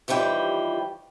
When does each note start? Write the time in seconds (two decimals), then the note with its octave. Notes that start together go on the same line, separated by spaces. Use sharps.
0.08 D#2 E3 F3 G3 G5